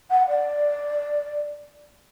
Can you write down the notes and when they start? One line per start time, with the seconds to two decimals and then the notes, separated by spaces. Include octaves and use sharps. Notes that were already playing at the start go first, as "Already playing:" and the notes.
0.10 F#5
0.28 D5